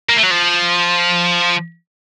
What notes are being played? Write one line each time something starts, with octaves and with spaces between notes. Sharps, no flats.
A#3
A3
F#3
F3